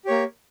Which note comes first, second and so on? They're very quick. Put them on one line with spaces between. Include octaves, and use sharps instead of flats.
G4 C#5 A#3